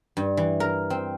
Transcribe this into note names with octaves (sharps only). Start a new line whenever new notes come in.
G2
E3
A#4
C4